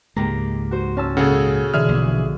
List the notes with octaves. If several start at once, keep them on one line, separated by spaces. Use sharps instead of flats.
C#2 G#2 G#3 A#3 G4 A#5
F#4 C5
C#4 A5 E6
A#2 C#3 G#4 A4 F#5
B2 D3 E3 G#4 E5 F6
A#1 D#2